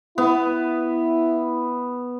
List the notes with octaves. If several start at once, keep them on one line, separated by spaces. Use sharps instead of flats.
B3 E4